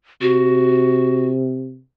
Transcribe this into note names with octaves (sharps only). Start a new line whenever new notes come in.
C3 F#4